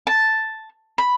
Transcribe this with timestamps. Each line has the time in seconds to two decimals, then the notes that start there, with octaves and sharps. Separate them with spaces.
0.07 A5
0.98 B5